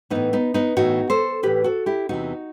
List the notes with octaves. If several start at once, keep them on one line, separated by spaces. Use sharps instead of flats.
A2 E3 B3 D#4
B3 D#4
B3 D#4
A2 E3 D#4 F#4
A4 C5
A2 E3 G4 B4
F#4 A4
E4 G4
E2 C3 E3 D#4 F#4